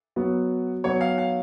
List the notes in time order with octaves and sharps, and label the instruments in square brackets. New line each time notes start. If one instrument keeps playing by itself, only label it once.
[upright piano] F#3 B3 F#4
[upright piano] F#3 B3 F#4 [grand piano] C#5
[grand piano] F5
F5